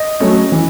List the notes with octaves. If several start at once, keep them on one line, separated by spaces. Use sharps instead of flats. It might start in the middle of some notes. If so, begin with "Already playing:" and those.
Already playing: D#5
F#3 A3 C#4
E3